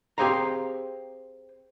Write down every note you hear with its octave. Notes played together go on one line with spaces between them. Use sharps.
C4 G4 G#4 C5 F5 A#5